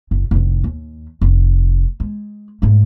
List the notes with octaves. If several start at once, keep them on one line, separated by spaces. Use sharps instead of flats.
F#1
F1 A2
D#2
F1
G#3
G#2 A3